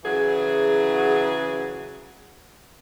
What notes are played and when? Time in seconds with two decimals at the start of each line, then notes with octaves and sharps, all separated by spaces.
0.04 C#3 E3 F#3 G#4